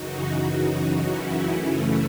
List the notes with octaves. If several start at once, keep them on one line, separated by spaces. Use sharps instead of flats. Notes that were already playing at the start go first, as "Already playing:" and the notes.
Already playing: F#2 C#3 E3 D#4 F#4
D#4 F#4
D#4 F#4
C#4 E4
F#2 C#3 E3 A3 C#4